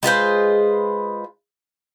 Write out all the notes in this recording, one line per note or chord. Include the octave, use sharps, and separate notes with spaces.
G#3 F4 B4 C5